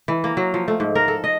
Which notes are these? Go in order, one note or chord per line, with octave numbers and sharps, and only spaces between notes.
E3
A#3
F#3
F3
A3
G#2
A#4
A4
D#5